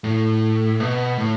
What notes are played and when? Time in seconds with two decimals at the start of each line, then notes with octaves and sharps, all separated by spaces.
0.04 A2
0.80 B2
1.18 A2